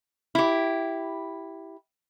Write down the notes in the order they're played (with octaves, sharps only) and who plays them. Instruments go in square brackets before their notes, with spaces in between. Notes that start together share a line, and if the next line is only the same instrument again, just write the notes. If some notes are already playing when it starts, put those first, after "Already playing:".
[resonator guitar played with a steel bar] E4 G4